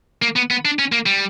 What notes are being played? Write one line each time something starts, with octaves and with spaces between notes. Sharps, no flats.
A#3
B3
B3
D4
C#4
A#3
G3